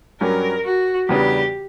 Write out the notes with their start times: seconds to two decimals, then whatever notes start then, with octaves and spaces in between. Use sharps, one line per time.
0.21 G2 F#3 C#4 G4 A#4
0.65 F#4
1.09 E2 C#3 G3 B3 D4 G4